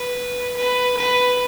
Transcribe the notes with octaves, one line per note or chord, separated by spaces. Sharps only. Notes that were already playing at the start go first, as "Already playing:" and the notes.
Already playing: B4
B4
B4